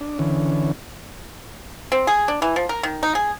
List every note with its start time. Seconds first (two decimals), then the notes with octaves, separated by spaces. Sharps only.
0.01 D4
0.19 D3 E3 C#4
1.92 C4
2.07 G#4
2.28 D4
2.42 E3
2.56 F3
2.69 A#4
2.83 D#3
3.03 D#4
3.15 G#4